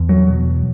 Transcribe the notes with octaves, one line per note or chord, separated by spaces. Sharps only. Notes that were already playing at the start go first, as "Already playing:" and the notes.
Already playing: E2
F#3
B2